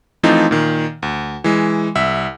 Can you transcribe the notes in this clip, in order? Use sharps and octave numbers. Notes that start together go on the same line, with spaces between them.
E3 F3 A3 C4 D#4 F4
A#2 D#3
D2
E3 G#3
C2 E5